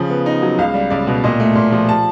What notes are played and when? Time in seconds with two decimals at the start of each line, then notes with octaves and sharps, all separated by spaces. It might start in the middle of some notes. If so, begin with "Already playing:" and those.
Already playing: C#3 F3
0.10 B3
0.26 D#4
0.42 F#3
0.58 C#2 F5
0.74 G3
0.90 C#2 D5
1.07 B2
1.24 A#2 D#5
1.40 A3
1.55 A#2
1.72 F3
1.89 A5